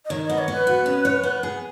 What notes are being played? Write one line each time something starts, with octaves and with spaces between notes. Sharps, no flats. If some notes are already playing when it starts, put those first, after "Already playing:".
D#5
D#3 C#5
B3 D#5
C#5
B3
B4
F#4
C#4
C#5
B3
G#4